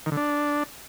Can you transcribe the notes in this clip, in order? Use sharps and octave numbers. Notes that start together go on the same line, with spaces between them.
D#3
D3
D4